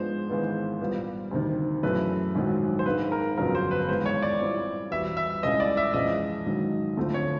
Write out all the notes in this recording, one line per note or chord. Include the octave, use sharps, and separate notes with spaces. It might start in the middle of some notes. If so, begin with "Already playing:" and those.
Already playing: G#2 F3 G#3 B3 D4 C5
G#1 G#2 E3 G#3 B3
A#2 G3 B3
D2 C3 D#3
F#2 C#3 E3 A3 B4
A#1 G#2 D#3 F#3
C5
G#1 G#2 D#3 G#3 B4
A#4
G1 F2 C#3 F#3 B3 A#4
C5
B4
G#1 G#2 E3 G#3 B3 C5
C#5
D5
A#2 G3 C4 E4
E2 B2 G3 E5
E5
C#2 C#3 E3 D#5
D5
E5
F2 C#3 E3 G#3 D#5
G#2 D#3 F#3
D2 D3 F3 A3 C4
C#5